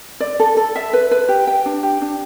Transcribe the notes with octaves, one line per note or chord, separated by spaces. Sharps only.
D5
A4
A4
E5
B4
B4
G4
G5
D4
G4
D4